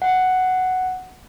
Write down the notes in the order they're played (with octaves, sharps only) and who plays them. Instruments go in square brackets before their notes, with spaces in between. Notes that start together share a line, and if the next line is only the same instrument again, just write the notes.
[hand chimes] F#5